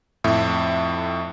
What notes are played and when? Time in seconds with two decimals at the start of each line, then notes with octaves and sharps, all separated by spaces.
0.24 F2 A2 E5